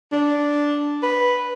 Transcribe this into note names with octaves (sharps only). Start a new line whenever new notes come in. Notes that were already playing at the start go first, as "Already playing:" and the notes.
D4
B4